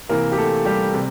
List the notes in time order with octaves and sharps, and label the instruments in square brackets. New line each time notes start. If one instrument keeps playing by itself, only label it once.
[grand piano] C3 E3 A#3 A#4
G4
A3 A4
G3 G4
C3